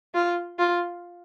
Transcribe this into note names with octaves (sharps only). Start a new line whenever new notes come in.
F4
F4